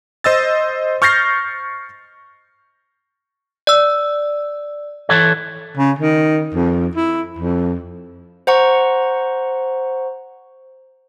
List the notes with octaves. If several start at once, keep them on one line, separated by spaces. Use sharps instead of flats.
C5 D#5 E6 A6
C#6 F6 G6 A6 A#6 C7
D5 E6
E3 A4 C#5
C#3
D#3
F2
E4
F2
C5 F#5 A#5 C#6